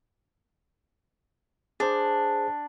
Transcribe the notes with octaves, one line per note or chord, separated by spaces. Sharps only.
D4 G#4 C5